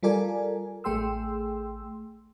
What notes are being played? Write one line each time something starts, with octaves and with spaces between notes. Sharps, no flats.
G3 F4 A4 A#4 D5 G#5
A1 A3 G#4 G5 C6 E6